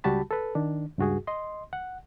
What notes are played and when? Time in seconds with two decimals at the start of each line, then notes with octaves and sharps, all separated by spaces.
0.04 C#2 G3 F#4 G4 A5 B5
0.31 A4 B4
0.55 D#3 D4
0.98 C#2 G2 F#4 G#4
1.27 D#5 C6
1.73 F#5